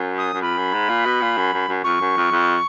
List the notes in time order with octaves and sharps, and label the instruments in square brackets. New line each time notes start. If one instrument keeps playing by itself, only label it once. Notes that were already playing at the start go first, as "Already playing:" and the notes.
Already playing: [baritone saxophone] F#2
[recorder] D#6
[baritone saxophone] F#2
[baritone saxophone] F2 [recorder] B5
[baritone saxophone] F#2
G#2
A#2
B2
A#2
F#2
F#2
F#2
[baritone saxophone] F2 [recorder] C#6
[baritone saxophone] F#2
F2
F2